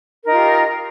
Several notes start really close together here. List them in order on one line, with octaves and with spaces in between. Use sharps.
A#4 D#4 F4 G4